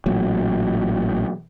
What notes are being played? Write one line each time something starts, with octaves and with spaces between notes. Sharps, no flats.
A1 A#2 F#3